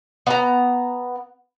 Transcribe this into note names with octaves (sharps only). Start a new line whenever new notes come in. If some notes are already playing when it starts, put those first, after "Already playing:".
B3 A#5